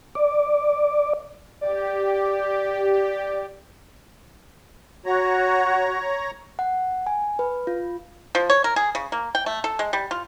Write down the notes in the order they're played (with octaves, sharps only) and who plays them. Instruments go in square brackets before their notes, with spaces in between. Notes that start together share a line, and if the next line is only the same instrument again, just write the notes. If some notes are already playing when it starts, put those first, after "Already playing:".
[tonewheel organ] D5
[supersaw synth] G4 [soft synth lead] D5
[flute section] F#4 [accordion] C#5 A#5
[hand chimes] F#5
G#5
B4
F4
[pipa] F3
C#5
A#4
G#4
C#3
A#3
G5
A3
A4
G#3
G3
F4